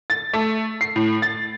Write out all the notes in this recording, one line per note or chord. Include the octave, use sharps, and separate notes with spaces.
A6
A3
C7
A2
A6